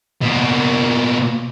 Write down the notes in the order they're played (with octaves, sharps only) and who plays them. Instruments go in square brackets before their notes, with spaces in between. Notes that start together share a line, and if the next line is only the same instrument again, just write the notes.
[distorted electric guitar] B2 A#3